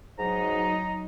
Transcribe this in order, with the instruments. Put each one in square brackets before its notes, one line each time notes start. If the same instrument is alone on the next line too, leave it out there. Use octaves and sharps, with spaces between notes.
[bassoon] G#2 [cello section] F#3 D#4 [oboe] A#5